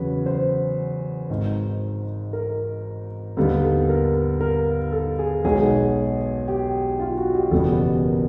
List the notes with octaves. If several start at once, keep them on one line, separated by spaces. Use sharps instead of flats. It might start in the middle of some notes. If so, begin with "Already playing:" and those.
Already playing: E2 C#3 F#3 B4
C5
G#1 G#2 D#3
A#4
D#2 D3 G3 B3 A4
A4
A#4
A#4
A4
G#4
B1 B2 G#3 G#4
G4
F4
F#4
G4
F#1 E2 B2 G3 B3 A4
A#4